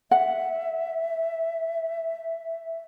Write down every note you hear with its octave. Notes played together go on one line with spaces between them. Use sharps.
E5 F#5